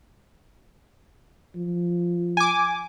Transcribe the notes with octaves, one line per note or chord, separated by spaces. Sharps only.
F3
G#5 D6